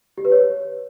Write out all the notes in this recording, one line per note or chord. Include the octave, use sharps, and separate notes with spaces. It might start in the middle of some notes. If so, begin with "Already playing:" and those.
G4
B4
C#5